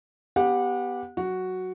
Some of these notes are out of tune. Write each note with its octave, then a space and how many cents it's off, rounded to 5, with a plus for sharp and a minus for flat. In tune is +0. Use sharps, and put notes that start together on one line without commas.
B3 +0 G4 +0 F#5 -30
F#3 +0 F#4 +0